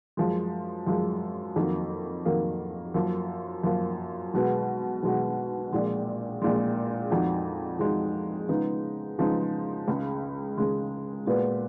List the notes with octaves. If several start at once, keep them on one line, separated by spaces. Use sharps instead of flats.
F#2 F3 G#3
F#2 F3 G#3
F2 D#3 F#3 A#3
F2 D#3 F#3 A#3
F#2 F3 A#3
F#2 F3 A#3
B1 B2 G#3 B3 F#4
B1 B2 G#3 B3 F#4
A#1 A#2 G#3
A#1 A#2 G#3
F2 F3 G#3 D#4 F#4
F2 F3 G#3 D#4 F#4
C#3 F3 G#3 B3 D#4
C#3 F3 G#3 B3 D#4
C#2 C#3 G#3
C#2 C#3 G#3
A#2 G#3 B3 F#4 B4